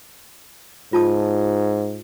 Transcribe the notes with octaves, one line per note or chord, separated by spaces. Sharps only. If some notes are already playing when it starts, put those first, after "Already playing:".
G#2 F4 A5 D#6